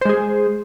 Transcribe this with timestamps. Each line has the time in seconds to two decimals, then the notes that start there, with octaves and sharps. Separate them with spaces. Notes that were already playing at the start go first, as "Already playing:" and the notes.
0.01 C5
0.05 G#3
0.09 G#4